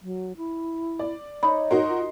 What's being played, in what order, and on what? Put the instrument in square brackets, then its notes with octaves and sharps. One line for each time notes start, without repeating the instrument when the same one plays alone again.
[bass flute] F#3
E4
[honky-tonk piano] D5
[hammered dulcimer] D#4 [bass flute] C#5 [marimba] B5
[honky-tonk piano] D#4 F#4 A#4 [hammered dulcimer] C6
[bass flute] F4